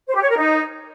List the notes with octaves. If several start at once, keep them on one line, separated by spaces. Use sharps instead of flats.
C5
G4
C#5
A#4
D#4